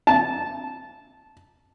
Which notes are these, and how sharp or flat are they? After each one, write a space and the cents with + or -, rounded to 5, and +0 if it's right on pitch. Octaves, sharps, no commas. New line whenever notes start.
A5 -15